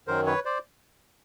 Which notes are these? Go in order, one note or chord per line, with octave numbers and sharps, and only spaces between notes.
F#2 D#3 F#3 A#4 C5
B4 C#5
C5 D5